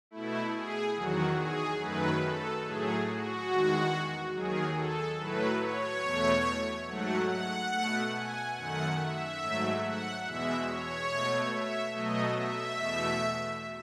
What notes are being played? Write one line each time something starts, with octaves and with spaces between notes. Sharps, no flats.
B2 A3 E4
G#4
E2 D#3 F#3 F#4
G#4
F#2 D#3 F#3 A3 B4
A4
A2 F#3 A3 G#4
F#4
E2 D#3 G#3
D#2 D#3 F#3 G#4
A4
A2 F#3 A3 B4
C#5
E2 B2 A3
G#2 F#3 A3 F#5
F#5
B2 A3
G#5
F#2 D#3 A3 F#5
E5
G#2 F#3 A3
F#5
E2 B2 G#3 E5
C#5
B2 A3
E5
B2 F#3 A3 D#5
E5
E2 B2 A3